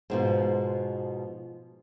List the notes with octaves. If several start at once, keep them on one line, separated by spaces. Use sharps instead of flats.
G#2 B2 F3